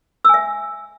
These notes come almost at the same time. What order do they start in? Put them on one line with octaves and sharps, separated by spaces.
E6 G#5 E5